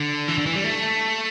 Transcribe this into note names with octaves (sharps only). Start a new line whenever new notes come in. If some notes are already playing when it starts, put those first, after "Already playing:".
Already playing: D3
E3
D3
E3
G3
A3